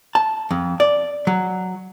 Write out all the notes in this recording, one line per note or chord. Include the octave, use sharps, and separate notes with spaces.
A5
F2
D5
F#3